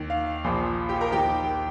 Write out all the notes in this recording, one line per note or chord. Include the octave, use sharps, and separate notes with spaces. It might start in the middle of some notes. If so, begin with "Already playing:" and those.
Already playing: D#2 D#3
F5
A#1 A#2 F3
G4 G5
A#4 A#5
D#2 D#3 G4 G5